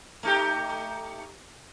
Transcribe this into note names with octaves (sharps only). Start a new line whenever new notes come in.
A3 D#4 G4